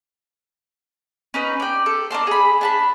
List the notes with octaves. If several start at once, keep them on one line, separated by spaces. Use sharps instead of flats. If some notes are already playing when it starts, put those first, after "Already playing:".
C#4 D#4 B4
D5 G5
A4
D4 A#4 A5 C6
G#4 B5
D4 A5 B5